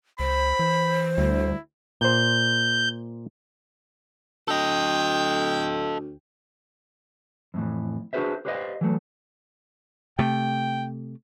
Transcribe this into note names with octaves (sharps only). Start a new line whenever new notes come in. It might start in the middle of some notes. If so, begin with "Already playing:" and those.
C#2 C5 B5
E3
D2 G3 E4
A#2 C5 G6
D2 A4 D#5 G5
F2 A2 E3
D4 F#4 G#4 B4 C5 E5
G4 B4 C5 D5 D#5 F5
E3 F#3 A3
C3 A3 G5